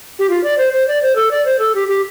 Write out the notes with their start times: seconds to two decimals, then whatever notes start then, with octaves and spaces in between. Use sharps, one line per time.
0.19 G4
0.30 F4
0.44 D5
0.58 C5
0.73 C5
0.88 D5
1.02 C5
1.16 A4
1.31 D5
1.45 C5
1.59 A4
1.75 G4
1.88 G4